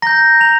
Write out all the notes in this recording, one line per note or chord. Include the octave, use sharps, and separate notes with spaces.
A#5 G6 A#6
A#5 F7